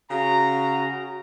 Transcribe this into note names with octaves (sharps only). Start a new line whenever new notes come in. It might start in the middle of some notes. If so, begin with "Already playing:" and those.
C#3 F#4 A#5